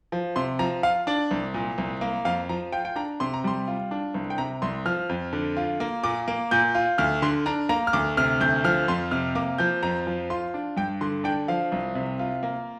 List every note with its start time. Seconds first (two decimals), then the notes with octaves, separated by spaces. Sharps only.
0.12 F3
0.36 C3 C6
0.59 F3 A#5
0.83 F4 F5
1.07 D4 D5
1.31 C2
1.54 A#2
1.78 C2
2.01 A#3
2.25 F2 F5
2.49 F3 A#5
2.72 F4 G5
2.85 G5
2.96 D4 A#5
3.20 C3 C6
3.34 A#5
3.44 G3 C6
3.68 F4
3.91 D4
4.14 C2
4.30 G5
4.38 C3 A#5
4.62 C2 C6
4.85 F3 F6
5.09 F2
5.33 D3
5.57 F4
5.80 A#3
6.04 A#2 D6
6.28 A#3
6.51 A#2 G6
6.75 F4
6.98 D2 F6
7.22 D3 C6
7.46 D4 A#5
7.69 A#3 A#5
7.87 F6
7.93 D2 D6
8.17 C3 F6
8.41 D2 G6
8.64 F3 F6
8.88 F2 C6
9.11 C3 F6
9.35 A#3 D6
9.58 F3 G6
9.83 F2 A#5
10.07 F3
10.30 F4 C6
10.54 D4
10.77 G2 G5
11.01 D3 C6
11.24 D4 G5
11.48 F3 F5
11.72 C2
11.95 C3
12.19 F4
12.43 A#3